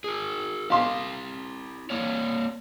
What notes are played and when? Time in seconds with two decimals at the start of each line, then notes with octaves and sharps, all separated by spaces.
0.04 G#4 A#4
0.70 E4 G4 F5 C6
1.90 A#3 C#5 D5